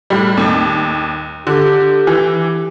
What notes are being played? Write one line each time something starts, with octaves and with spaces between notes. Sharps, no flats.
A2 G3
D#2
D3 G4
E3